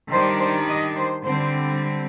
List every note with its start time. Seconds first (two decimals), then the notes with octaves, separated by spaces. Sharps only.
0.10 D#3 G3 D4 C5
0.39 C5
0.68 D#5
0.96 C5
1.24 D3 G3 C4 C5